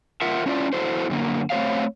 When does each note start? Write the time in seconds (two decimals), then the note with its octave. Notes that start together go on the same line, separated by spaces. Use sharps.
0.21 F4 A#4 E5 F#5
0.46 C#4 E4 F4 D5
0.73 E4 F#4 A4 C5
1.10 F#2 D3 A#3
1.50 A3 C4 C#4 C5 C#5 F5